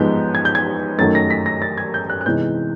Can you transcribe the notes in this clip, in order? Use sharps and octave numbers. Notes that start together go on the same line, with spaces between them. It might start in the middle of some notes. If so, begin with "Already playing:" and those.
Already playing: G#2 F3 G#3 B3 G6
G#6
G6
G#6
F#2 D#3 F#3 A3 A6
A#6
B6
A#6
A6
G#6
G6
F#6
F#6
C3 E3 G#3 B3 D#4 G6